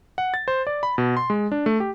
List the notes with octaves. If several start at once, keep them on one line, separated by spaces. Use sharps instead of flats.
F#5
A6
C5
D5
B5
B2
C6
G#3
D4
A3
G4